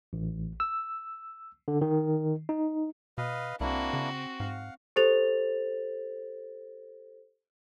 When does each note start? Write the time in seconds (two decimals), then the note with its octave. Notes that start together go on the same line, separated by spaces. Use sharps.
0.13 A1
0.60 E6
1.68 D3
1.81 D#3
2.49 D#4
3.18 B2 B4 D#5 F5
3.60 C2 A#3 C4 D4 E4 F#4
3.93 C#3
4.40 G#2 F5 F#5
4.96 G4 A4 C5 A6 F7